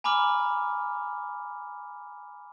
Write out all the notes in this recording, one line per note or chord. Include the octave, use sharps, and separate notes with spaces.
G#5 A#5 B5 D6 F6 F#7